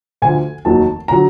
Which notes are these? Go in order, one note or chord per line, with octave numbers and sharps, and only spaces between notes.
D2 D3 F3 G#5
F1 D#2 D#3 F#3 A5
D3 F#3 A#5